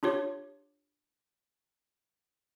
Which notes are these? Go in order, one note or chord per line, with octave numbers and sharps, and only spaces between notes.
D4 F4 G4 C#5